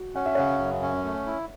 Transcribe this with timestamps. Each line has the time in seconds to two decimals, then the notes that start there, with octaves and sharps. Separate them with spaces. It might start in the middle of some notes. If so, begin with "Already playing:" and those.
Already playing: F#4
0.15 C#4 F#5
0.26 E5
0.35 C#3 C#5 F#5
0.59 F#2
0.82 C#4
1.04 A3
1.26 E4